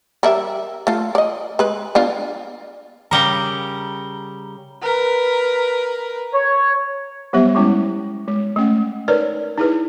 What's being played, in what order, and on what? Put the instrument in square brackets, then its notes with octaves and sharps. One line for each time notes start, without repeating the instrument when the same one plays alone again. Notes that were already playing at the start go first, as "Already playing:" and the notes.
[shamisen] G3 A#4 E5
A3 F4
D5 D#5
G#3 B4
B3 D4 F4
[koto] C#3 G3 A#4 [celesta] A#5 G7
[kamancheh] A#4 B4
[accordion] C#5
[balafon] F#3 G3 B3 G4 C5 E5
G3 G#3 C#4 E4
G#3
A3 C#4 F#5
D#4 A#4 B4 C#5 D5
D#4 E4 G#4 B4